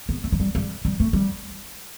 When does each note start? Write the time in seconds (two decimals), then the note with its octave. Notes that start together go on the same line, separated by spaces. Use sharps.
0.09 B3
0.24 A3
0.32 F#3
0.40 G3
0.55 G3
0.85 G3
1.00 A3
1.13 G3